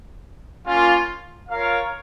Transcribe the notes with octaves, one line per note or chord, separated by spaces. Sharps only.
A#3 C#4 F4
F4 A#4 C#5 F5